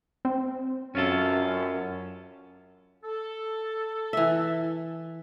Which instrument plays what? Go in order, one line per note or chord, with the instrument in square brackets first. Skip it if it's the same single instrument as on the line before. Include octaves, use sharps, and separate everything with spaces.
[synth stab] C4
[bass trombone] F#2 [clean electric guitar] C#4 F4 A4
[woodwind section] A4
[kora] E3 E5